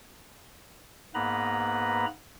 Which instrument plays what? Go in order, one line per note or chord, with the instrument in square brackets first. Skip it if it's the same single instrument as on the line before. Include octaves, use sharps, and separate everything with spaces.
[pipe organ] G#2 A#3 B3 B4 A#5 B5